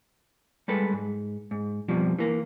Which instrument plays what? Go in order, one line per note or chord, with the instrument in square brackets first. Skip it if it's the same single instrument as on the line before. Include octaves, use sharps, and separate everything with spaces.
[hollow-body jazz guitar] G3 G#3 A4 B4
G#2
G#2
F2 B2 F3 G3
E3 A#3